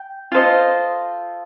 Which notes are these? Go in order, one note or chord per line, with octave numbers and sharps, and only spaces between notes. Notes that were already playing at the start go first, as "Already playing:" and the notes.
Already playing: G5
F4 A4 C5 D#5